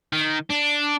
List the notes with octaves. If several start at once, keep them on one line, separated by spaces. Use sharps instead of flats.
D#3
D4